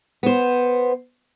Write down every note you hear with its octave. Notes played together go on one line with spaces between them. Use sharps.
B3 C5